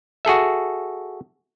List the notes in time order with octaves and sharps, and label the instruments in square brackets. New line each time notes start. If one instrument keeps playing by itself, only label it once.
[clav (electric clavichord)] F#4 G#4 A4 E5